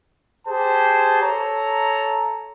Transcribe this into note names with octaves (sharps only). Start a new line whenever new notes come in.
G4 G#4 C5 A5
A4 C#5 A#5